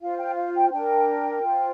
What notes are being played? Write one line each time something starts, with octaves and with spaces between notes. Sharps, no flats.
F4 C5 F5
G5
F5
G5
D4 A#4 G5
F4 C5